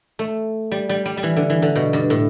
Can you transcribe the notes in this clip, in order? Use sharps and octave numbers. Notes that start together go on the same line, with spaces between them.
A3
G3
G3
G3
G3
E3
D3
E3
D3
B2
G2
A2